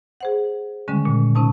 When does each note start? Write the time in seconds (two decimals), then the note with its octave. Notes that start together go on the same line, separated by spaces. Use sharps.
0.21 G#4 C5 F#5
0.88 D3 D#3 G3 G#3 C#4
1.05 A#2
1.35 C3 C#4 D#4 A5